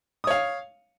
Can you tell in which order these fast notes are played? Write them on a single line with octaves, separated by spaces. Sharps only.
D#6 C#5 F5